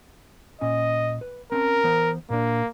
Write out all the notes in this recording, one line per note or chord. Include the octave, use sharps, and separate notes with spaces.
A#2 C#4 D#5 G#5
B4
C4 C#4 A#4 A5
E3 B3 C5
A#2 A#3 D4